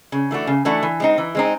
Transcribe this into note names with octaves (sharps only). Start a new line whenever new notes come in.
C#3
E3 A3 D4 F#4
C#3
E3 A3 D4 F#4
E3
G#3 C4 D#4
E3
G#3 C4 D#4